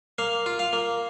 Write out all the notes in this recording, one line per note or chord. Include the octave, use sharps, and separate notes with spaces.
A#3 F5
F4
F5
A#3